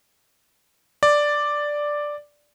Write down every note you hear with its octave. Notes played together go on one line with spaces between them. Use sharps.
D5